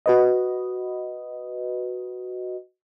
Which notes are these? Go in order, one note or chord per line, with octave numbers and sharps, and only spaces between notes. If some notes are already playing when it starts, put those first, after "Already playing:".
F#4 B4 D#5